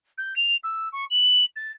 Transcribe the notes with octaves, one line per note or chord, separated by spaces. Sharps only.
G6
F7
E6
C#6
F#7
A6